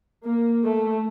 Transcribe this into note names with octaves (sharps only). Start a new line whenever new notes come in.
A#3
A3